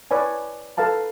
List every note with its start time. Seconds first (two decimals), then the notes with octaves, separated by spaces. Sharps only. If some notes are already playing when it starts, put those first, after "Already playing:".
0.11 B4 C#5 D5 G#5
0.77 A4 B4 F5 A5 A#5